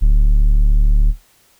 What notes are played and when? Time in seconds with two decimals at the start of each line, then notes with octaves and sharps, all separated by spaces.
0.01 D1